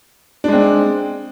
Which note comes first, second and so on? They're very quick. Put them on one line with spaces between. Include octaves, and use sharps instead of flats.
D4 G#3 C4